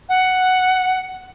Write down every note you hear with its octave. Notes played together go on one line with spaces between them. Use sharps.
F#5